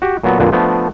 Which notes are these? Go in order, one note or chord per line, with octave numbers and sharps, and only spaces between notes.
F#4 G4
A#2 F#3 B3 A4
F2 A#2 D3 B3
F3 A3 B3 D4